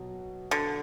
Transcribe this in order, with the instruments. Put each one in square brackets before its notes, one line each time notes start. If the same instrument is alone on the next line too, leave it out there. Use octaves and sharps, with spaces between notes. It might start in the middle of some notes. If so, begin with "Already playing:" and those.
Already playing: [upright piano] B2 F#3
[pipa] D3